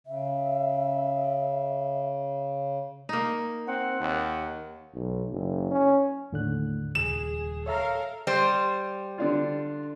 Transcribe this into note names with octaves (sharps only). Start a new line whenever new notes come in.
C#3 E5
A#3 D#4
C4 F#5
D#2
B1
F#1
C#4
D#2 A2 D3 F#6
D#1 C#2 G#4 E7
A4 A#4 C#5 E5 F5 A#5
G3 C5
D3 D4 F4